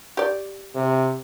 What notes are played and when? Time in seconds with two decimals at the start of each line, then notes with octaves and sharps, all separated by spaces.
0.17 G4 D5
0.75 C3